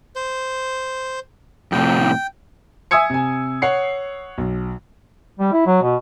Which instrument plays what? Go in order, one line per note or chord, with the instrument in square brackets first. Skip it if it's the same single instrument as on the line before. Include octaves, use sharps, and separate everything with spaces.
[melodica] C5
[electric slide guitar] F2 A2 C3 [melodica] G5
[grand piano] E5 G#5 D#6 E6 G#6 C#7
C3 G#5
C#5 F#5 C7 C#7
B1
[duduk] G3
E4
F#3
B2